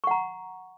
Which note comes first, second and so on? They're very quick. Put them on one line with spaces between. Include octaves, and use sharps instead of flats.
C#6 F#5 A#5